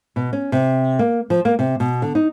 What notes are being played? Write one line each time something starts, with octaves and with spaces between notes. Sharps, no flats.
B2
C#4
C3
A#3
F3
A#3
C3
B2
D3
D#4